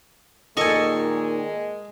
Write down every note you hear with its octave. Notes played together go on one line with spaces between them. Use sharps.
A#2 D#3 G#3 A4 D#5 G#5 C#6